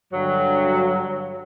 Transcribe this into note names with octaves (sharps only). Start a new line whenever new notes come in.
G2 D3 F#3